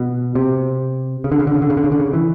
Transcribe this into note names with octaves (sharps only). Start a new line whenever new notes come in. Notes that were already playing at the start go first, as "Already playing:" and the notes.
Already playing: B2
C3
C#3
D3
C#3
D3
C#3
D3
C#3
D3
C#3
D3
C#3
E3